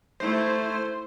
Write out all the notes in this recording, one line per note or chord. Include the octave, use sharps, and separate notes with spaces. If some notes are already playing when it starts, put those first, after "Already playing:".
A3 E4 C5